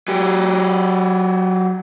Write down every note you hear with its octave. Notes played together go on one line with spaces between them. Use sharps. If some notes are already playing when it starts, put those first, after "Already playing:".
F#3 G4